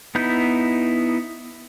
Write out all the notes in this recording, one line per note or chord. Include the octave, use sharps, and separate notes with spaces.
B3 D#4 E4 G6